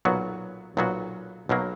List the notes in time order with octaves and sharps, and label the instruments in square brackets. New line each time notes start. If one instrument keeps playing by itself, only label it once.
[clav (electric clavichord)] B1 A#2 F#3 B3 F#4
B1 A#2 F#3 B3 F#4
B1 B2 F#3 A#3